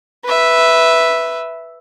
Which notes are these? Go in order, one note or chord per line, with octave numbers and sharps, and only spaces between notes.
B4 E5